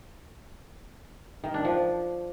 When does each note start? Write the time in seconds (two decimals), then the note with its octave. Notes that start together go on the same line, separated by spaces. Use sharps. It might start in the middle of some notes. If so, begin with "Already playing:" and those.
1.44 D#3
1.54 D4
1.65 F3